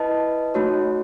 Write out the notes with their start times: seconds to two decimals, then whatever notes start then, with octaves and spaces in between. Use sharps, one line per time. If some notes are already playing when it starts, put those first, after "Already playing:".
Already playing: E4 B4 D#5 A5
0.54 A3 D#4 F#4 C#5